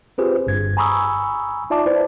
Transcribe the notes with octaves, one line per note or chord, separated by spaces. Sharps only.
C4 F4 G4 G#4 B4 C5
G1 G2 G#6
G#5 A#5 B5 C#6 D#6 E6
D#4 F4 D5 E5 A5 D6
E4 B4 C5 D5